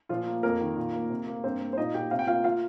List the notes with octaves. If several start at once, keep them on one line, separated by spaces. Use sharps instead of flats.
A#2 F3 F4
A#3
F2 A#3 A#4
D#3
A#2
A#3
C3
A#3
G2 C4 C5
A#3
C5
A#2 D#4 D#5
A#2 G4 G5
C3 F5
G5
A#3 F4 F5
F4 F5